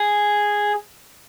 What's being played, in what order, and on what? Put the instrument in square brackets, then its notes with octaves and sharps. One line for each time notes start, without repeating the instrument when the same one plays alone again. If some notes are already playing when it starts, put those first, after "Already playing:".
Already playing: [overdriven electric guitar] G#4